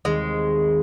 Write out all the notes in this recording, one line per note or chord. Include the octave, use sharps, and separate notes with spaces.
D#2 D#3 G3 G#3 C4